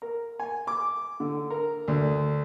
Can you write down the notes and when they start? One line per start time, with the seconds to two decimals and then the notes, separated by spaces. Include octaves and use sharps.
0.02 A#4
0.40 G#5
0.67 D6
1.20 D3
1.50 A#4
1.88 D2